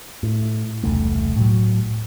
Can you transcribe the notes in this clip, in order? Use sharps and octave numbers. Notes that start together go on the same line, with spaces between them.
A2
E1 C2 A3
A2 F#3